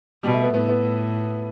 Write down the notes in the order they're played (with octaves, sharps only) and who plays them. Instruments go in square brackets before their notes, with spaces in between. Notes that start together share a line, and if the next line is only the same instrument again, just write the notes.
[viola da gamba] B2 [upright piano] G3
[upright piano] A3
B3
[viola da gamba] A2 [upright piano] B3
[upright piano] B3